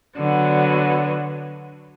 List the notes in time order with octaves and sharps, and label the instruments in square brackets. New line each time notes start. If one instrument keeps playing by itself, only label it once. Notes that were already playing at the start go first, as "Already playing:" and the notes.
[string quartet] D3 F#3 B3